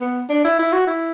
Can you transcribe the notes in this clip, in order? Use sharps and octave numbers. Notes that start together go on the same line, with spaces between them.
B3
D4
E4
E4
F#4
E4